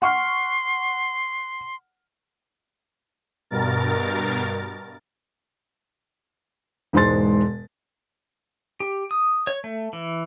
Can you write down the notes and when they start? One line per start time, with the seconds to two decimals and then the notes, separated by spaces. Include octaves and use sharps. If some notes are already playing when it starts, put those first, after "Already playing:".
0.02 F#5 C6 C#6 F6
3.50 G2 B2 A#4 A6
6.93 E1 G#2 G#3 C5 C6 A6
8.80 G4
9.11 D#6
9.47 C#5
9.64 A3
9.93 E3